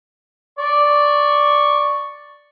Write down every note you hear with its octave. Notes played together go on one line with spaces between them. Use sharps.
D5 C#6